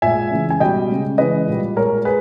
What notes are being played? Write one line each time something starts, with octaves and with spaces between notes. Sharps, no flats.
A#2 G#3 E5 G#5
C#3 E3 G#3
G#5
B2 G3 D#5 G5
C#3 G#3
C#3 E3 G#3 B4 D#5
A#2 G3
A#2 G#3 A#4 C#5
G#4 B4